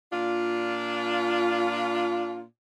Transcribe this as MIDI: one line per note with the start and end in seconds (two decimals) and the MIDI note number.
0.12 2.43 46
0.12 2.43 62
0.12 2.43 65